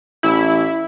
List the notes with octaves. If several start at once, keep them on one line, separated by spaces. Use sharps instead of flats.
A1 E4